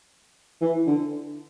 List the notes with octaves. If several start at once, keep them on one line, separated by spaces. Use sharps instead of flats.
E3
D3